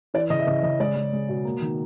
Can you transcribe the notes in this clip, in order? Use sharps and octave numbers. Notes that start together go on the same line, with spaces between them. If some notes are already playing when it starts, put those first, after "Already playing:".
E3 D5
C#3 D#5
E5
C#3 D#5
C#3 D#5
G#3 D5
G#3
G#3
B2
A#3
D#3